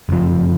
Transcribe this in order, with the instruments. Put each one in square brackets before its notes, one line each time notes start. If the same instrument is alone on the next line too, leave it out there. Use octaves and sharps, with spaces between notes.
[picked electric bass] F#1 F2 F3